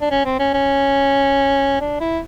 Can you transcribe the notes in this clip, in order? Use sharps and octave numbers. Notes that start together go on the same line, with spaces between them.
D4
C#4
C4
C#4
C#4
D4
E4